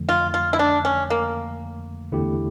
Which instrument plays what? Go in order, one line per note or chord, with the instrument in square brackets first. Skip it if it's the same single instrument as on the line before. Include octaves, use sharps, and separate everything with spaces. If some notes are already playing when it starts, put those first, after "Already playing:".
Already playing: [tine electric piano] F2 D3 F3 A3
[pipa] F4
F4
E4
D4
C#4
A#3
[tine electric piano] E2 D3 A3 E4 G4